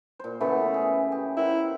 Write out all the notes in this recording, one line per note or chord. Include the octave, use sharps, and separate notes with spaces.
A#2 C5
C#3 E3 A3 B3
G#4
G4
E4 A#4 C5 F#5